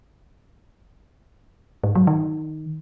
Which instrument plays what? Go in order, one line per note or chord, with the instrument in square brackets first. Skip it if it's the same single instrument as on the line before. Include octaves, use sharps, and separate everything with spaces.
[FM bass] G#2
F#3
D#3